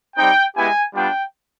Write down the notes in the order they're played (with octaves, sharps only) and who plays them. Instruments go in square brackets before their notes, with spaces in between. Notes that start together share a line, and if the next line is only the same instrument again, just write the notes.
[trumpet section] G3 C4 D#4 G5
G#3 B3 E4 G4 G#5
G3 B3 D4 F4 G5